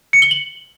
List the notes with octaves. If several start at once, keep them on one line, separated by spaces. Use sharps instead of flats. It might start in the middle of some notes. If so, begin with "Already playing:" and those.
C#7
G7
F#7